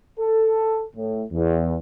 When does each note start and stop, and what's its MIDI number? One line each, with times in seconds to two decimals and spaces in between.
0.19 0.83 69
0.96 1.24 45
1.32 1.75 40